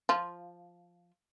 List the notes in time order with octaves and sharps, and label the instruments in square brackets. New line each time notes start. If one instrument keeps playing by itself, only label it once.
[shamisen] F3 F4